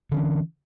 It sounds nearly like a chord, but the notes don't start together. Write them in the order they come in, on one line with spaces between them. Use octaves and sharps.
D3 C#4 E3